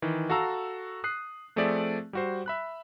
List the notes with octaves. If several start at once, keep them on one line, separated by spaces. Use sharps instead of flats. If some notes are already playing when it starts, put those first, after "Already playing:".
D#3 E3
F#4 A4 F5 A5 A#5 E6
D#6 F#6 C7
F3 A3 C4 G#4 D5 E5
G3 F#4 C5
E5 B5 F#6